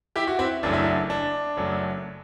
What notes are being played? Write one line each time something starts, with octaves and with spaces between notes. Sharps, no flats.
E4 G4
F#4
C4 E4
F#1 F#2 F#3 A3 D4
E4
D4
D4
F#1 F#2 F#3 A3